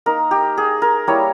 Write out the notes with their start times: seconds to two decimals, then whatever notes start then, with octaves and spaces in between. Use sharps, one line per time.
0.06 A#3 D#4 A#4
0.31 G4
0.57 G#4
0.82 A#4
1.07 G3 A#3 E4 C#5